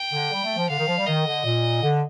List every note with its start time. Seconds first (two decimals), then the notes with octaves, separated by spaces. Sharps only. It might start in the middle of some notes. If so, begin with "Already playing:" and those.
Already playing: G5
0.12 D3
0.31 G3
0.44 A3
0.56 F3
0.69 D3 F5
0.79 D#3
0.88 F3
0.98 G3
1.06 D#3 D#5
1.26 D3
1.44 A#2
1.82 D3